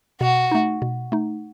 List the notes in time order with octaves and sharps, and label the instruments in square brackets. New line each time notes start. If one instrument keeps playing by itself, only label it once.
[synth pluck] B2 [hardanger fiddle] F#4
[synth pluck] A3 D#4
B2
A3 D#4